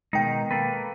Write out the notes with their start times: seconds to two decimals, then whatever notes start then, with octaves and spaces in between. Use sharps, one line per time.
0.13 B2 D#3 G#3 D#4 G5
0.51 A#3 A4 B4